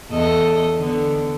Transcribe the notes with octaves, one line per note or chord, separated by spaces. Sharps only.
E2 A4 D#5
D3 B3